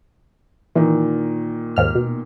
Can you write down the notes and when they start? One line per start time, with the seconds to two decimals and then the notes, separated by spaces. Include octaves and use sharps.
0.75 A#2 D#3 E3
1.76 D#2 G#2 F6
1.95 B2